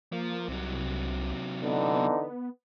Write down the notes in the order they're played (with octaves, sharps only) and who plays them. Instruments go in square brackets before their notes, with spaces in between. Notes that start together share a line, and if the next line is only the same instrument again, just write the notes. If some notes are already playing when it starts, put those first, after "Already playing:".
[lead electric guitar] F3 [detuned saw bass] A#3
[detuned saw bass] C2 [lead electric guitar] C3 F#3
[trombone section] D3 E3 D#4 [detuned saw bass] B3